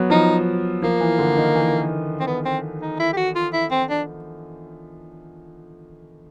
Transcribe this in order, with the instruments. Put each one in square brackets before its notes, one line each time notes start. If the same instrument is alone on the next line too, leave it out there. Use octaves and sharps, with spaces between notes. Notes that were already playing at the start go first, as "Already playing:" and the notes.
Already playing: [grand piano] F#3 B3
[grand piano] F3 [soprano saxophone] D#4
[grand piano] F3 [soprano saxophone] A#3
[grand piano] E3
D3
D#3
E3
[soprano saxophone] C4
B3
C4
D#4
E4
G4
F#4
F4
E4
C4
D4